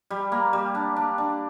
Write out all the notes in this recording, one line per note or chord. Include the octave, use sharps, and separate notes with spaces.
G3
A#3
G3
D4
D4
D4